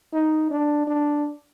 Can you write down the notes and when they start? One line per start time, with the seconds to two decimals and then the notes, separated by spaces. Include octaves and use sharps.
0.13 D#4
0.50 D4
0.87 D4